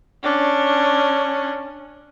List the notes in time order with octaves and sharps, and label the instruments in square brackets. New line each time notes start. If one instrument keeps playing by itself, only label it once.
[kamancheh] C#4 D4